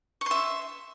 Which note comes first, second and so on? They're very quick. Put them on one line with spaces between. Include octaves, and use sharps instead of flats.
C#6 C6 E5